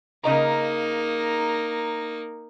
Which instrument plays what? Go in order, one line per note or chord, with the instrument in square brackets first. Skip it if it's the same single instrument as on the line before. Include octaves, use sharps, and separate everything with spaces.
[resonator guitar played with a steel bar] C#3 D#5 A#5 [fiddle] A#3 D#4